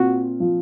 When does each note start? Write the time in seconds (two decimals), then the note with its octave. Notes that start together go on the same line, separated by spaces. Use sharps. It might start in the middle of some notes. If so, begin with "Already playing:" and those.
Already playing: A#2 C4 F#4
0.40 F3